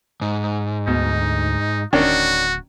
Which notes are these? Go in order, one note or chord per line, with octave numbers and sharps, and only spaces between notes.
G#2
D2 B2 D#4
D1 D#3 C#4 D4 F#4